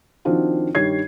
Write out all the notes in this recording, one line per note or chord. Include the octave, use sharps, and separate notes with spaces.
D#3 F3 C4 D4 F4 F#4
G2 D#3 G3 C#5 G#6 C7